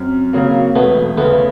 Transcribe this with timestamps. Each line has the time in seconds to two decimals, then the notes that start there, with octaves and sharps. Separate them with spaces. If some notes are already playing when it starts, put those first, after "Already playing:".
Already playing: F#2 C4
0.33 C#3 F#3 A#3
0.75 E1 A3 B3
1.17 D2 C#3 A3 B3